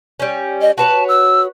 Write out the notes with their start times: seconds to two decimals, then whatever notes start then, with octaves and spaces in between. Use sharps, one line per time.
0.20 G3 C#4
0.61 D#5
0.78 F#4 B4 C#5 A5
1.08 E6